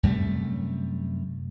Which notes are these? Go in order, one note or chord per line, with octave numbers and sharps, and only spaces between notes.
F#2 C3 G3 A3